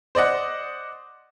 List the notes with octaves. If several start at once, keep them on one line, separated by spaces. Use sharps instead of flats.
C5 D5 D#5 F#5